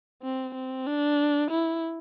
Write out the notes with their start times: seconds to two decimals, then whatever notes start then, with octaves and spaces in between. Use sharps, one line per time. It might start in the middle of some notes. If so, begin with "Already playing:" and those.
0.22 C4
0.54 C4
0.87 D4
1.51 E4